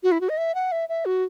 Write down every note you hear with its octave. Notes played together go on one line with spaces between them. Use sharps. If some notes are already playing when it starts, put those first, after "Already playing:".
F#4
E4
F#4
D#5
E5
F#5
E5
E5
F#4